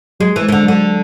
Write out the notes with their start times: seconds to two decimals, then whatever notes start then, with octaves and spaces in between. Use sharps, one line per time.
0.20 F#3 G#3
0.36 E3
0.42 G#3
0.48 E3
0.52 D3 G#3
0.63 F#3
0.68 D3